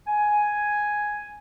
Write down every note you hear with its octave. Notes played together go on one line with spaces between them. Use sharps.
G#5